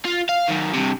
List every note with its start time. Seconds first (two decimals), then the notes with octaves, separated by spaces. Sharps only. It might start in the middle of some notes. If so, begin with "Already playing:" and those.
0.05 F4
0.29 F5
0.48 F#2 D#3
0.74 G2 C3